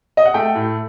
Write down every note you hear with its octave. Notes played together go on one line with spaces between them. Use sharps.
D#5
F#5
A3 G5
A2